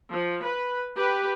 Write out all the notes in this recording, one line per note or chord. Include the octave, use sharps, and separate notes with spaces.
F3
B4
G4 B4